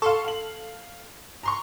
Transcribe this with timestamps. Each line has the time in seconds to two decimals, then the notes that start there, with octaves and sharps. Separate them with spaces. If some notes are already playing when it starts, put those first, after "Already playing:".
0.02 A4 F5 C6 C#6
0.25 F5 F#7
1.43 A#5 C6 C#6